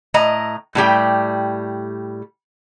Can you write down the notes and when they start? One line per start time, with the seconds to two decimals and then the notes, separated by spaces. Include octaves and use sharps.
0.14 A2 D#5 A#5
0.75 A2 G3 G4 G5